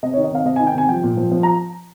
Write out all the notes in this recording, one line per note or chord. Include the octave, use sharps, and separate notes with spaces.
C3 D#5
C#5
D#3
D#5
C3 F5
C3 D#5
G#5
D#3
G5
C3 G#5
F3 G5
A#2
F3
F3
A#5